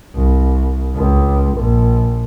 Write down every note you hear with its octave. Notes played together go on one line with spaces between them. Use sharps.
C2
C#2
A#1